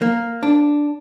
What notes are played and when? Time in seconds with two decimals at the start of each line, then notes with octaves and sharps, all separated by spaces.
0.02 A#3
0.43 D4